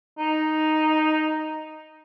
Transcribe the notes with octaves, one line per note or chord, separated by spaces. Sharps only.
D#4